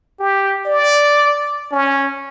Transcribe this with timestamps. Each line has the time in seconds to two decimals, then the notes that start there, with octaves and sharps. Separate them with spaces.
0.20 G4
0.66 D5
1.71 C#4